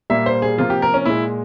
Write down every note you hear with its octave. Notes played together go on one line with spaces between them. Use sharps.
A#2 G3 A#3 E5
C5
G#4
C3 F3 A#3 F4
G4
A#4
C#4
A#2 G#3 E4